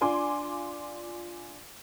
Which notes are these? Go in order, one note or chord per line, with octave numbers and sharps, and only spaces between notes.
D4 F4 G#5 C6 D6